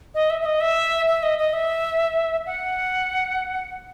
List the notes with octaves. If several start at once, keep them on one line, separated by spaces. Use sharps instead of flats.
D#5
E5
E5
D#5
E5
E5
D#5
D#5
E5
F#5